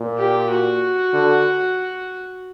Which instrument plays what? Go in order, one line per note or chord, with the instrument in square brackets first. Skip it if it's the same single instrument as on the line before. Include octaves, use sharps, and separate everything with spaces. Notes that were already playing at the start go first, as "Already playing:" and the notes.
Already playing: [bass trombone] A#2
[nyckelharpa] G4
F#4
[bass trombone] D3